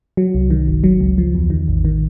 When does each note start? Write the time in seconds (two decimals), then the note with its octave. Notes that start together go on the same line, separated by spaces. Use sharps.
0.17 F#3
0.35 C2
0.50 D#3
0.68 G1
0.84 F#3
1.00 C#2
1.18 F3
1.35 E2
1.50 D#3
1.68 A1
1.85 D#3